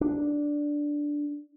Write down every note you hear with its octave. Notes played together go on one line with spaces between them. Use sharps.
D4